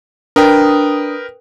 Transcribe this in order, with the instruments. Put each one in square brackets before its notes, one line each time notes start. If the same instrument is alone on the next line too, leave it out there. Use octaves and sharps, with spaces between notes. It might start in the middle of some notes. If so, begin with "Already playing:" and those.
[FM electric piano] D4 D#6 [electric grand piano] A#4 B4 G5